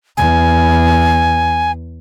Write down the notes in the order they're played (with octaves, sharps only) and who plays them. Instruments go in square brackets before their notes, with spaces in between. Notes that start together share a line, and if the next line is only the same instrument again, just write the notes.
[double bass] E2 [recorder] G#5